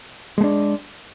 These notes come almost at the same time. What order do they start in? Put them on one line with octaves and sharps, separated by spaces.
G#3 A3 D4